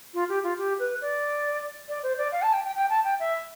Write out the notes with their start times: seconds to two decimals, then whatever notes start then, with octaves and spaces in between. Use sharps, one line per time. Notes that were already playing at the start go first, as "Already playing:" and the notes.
0.14 F4
0.29 G4
0.43 F4
0.58 G4
0.79 B4
1.01 D5
1.89 D5
2.03 C5
2.18 D5
2.32 F5
2.42 A5
2.53 G5
2.65 G5
2.76 G5
2.90 A5
3.05 G5
3.20 E5